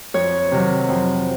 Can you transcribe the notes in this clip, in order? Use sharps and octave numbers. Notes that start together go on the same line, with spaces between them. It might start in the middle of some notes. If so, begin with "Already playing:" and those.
F2 C#5
C3 D#3 F#3
F2